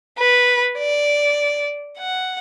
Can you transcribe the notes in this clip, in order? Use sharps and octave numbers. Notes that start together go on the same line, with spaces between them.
B4
D5
F#5